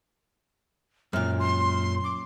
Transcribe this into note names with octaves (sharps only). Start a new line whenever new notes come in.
F#2 A#2 F6
C6
D6